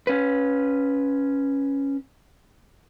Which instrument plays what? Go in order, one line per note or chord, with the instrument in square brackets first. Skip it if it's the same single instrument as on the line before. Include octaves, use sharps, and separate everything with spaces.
[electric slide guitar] C#4 B4